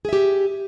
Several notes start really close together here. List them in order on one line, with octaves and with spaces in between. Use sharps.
G#4 E5 G4